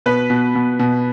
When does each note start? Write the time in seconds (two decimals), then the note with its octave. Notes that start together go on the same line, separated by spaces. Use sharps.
0.06 B2 B4
0.30 B2
0.55 B2
0.79 B2